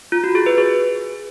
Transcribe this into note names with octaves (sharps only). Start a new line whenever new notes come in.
F4
F#4
G#4
B4
G#4